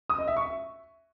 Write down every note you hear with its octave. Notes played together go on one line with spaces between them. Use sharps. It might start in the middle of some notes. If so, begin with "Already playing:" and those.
D#6
D#5
E5
C#6
E5